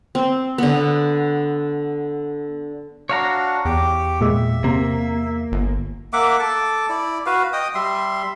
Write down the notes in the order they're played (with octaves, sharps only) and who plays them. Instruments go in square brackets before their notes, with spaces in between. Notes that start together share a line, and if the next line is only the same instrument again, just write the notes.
[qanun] C4
D3 B3
[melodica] D4 F#4 [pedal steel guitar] C#5 F5 A#5
[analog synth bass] E2 [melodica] G4 D6
[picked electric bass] A#2 G#3 [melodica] E5
[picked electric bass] C3 [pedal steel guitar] A#3
[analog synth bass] G1
[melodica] A#3 E5 F#5 D6
A4 A5 D6
E4 D5
F#4 B4 F5
D#5 G5 D#6
G3 E5 C6